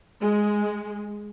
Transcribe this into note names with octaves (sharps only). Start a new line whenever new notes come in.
G#3